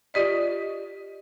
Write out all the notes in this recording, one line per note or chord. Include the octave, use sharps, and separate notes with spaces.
F4 G4 D5 D#5